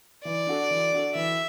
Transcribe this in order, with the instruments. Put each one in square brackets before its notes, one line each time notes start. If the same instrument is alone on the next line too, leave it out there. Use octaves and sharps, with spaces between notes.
[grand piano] E3 [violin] D5
[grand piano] D4 F#4 A4
E3
D4 F#4 A4
[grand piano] E3 [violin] E5